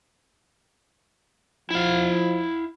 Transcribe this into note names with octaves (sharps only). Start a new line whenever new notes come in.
F3 E4 F5